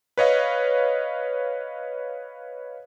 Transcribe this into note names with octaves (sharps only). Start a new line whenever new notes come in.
B4 C#5 D#5 F5